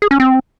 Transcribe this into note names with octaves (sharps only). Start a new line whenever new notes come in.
G#4
C#4
C4